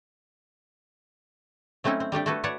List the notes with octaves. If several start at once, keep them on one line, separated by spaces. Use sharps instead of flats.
F#3 A3 C4 C#4 D#4 E4
C4
G3 A3 D4 G4
A3 E4 F#4 A4 B4
B4 C#5 D5 F#5 A5